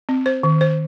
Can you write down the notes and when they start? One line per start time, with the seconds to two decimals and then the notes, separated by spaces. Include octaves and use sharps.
0.09 C4
0.26 C5
0.43 D#3
0.61 C5